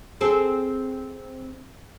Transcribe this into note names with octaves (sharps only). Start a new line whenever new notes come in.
C4 G#4 A4